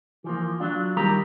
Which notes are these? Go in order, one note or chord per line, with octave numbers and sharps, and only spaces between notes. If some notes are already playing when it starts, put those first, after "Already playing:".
E3 F3 A#3
F#3 D4 F4
D#2 G3 D#4 G4 A#4 A#5